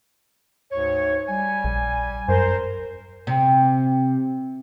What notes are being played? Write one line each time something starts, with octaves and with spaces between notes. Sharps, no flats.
D2 G#2 C#5
G3 G#5
A#1
F#2 A#4 C5
C3